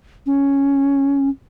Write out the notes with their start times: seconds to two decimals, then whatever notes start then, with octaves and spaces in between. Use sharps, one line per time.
0.26 C#4